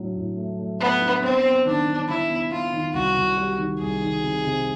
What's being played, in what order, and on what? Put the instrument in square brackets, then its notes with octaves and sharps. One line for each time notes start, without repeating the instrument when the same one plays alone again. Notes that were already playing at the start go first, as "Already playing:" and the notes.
Already playing: [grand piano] A2 F#3 D4
A2
A3
A3
[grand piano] A3 [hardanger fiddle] B3
[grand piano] D4
[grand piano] B3 [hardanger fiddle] C4
[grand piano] B3
[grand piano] D#3 [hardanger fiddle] D4
[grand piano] B3
[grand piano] D#3 [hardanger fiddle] E4
[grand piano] B3
[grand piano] B3 [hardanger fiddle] F4
[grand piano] D#3
[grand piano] C2 [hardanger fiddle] F#4
[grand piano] C2
G3
D#3
[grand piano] C2 [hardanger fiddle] G#4
[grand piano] D#3
C3
C3